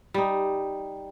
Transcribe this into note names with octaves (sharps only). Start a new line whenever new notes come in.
G3 D#4